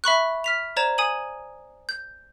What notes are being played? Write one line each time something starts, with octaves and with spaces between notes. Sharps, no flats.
E5 B5 C#6 F#6
F6 B6 F7
C5 D5 A#5 G#6 E7
G#5 D#6 G#6 D#7 F#7
G6